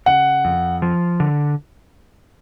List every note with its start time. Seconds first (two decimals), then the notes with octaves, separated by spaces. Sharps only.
0.06 C#3 F#5
0.45 F2
0.82 F3
1.20 D3